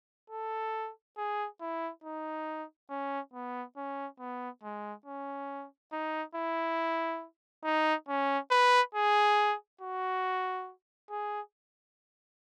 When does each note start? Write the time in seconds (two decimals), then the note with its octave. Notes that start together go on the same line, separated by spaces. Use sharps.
0.30 A4
1.18 G#4
1.61 E4
2.04 D#4
2.90 C#4
3.34 B3
3.77 C#4
4.20 B3
4.63 G#3
5.06 C#4
5.93 D#4
6.35 E4
7.65 D#4
8.09 C#4
8.51 B4
8.95 G#4
9.81 F#4
11.11 G#4